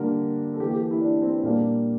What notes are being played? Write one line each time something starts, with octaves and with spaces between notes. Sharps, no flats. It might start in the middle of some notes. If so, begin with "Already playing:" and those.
Already playing: D3 G3 A#3 A#4
A4
E3 A#3 G4
G4
G4
E4
D4
C4
A#2 G3 A#3 D4